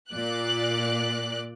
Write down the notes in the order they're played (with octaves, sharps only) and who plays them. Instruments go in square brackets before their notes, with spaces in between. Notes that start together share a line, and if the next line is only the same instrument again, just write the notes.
[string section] A#2 D5 F#6